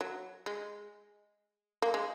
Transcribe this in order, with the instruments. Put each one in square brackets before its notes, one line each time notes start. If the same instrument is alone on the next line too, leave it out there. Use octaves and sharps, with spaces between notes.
[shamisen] F#3
G#3
A#3
G#3